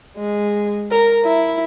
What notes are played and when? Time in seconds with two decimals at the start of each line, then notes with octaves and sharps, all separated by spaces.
0.17 G#3
0.91 A#4
1.24 E4